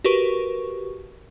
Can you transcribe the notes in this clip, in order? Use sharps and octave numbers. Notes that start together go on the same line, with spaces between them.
F#4 G4 A#4 B4 C#6